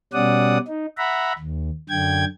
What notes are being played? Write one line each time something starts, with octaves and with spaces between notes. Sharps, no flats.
B2 G3 C#4 D5 F#5 D#6
D#4
E5 F#5 A#5 B5
D#2
F#2 D3 G5 G#6